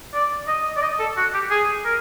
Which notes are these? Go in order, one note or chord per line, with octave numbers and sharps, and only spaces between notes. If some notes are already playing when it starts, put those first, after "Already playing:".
D5
D#5
D5
D#5
A4
F#4
G4
G#4
A#4